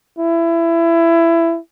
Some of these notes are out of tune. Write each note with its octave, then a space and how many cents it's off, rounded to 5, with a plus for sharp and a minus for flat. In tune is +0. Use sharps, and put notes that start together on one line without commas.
E4 +20